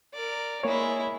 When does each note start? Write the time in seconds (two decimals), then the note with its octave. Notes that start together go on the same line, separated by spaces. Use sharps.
0.14 A#4 D5
0.64 G#3 A#3 E4 C#5